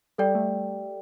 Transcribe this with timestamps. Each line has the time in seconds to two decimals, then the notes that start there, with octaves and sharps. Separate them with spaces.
0.18 G3 A4 D5 G5
0.35 A3